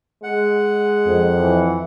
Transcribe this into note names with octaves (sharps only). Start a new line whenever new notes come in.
G#3 F#5
F2
E3